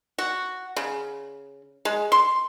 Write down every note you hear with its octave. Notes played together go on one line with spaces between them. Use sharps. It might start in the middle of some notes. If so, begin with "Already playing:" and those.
F#4
C#3
G#3
C6